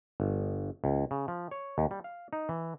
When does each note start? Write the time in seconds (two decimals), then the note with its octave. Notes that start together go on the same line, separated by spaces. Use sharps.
0.20 G1
0.84 C#2
1.11 C#3
1.28 F3
1.51 C#5
1.78 D#2
1.91 G3
2.04 F5
2.33 D#4
2.49 E3